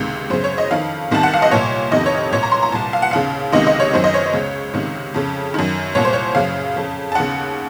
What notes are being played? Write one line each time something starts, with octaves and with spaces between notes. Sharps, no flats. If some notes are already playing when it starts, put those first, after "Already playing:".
Already playing: C#2 C3 D#3
F#2 C#3 C5
C#5
D#5
F2 D#3 F5
C2 C3 D#3 A5
F#5
F5
D#5
C2 A#2 C#5
F2 C3 D#3 D#5
C#5
C2 A#2 C#5
A#5
C6
A#5
C2 A#2 A5
F5
F#5
D#2 C#3 F5
C#2 C3 D#3 D#5
D#5
C#5
F#2 D#3 C5
D#5
C#5
C#2 C#3
C#2 C3 D#3
F2 C#3
F#2 D#3
C2 A#2 C#5
C5
C#5
F#2 C#3 F5
F2 C#3
A5
D#2 C#3 F#5